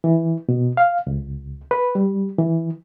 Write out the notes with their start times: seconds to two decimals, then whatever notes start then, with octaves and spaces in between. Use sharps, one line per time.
0.04 E3
0.49 B2
0.77 F5
1.07 C#2
1.71 B4
1.95 G3
2.39 E3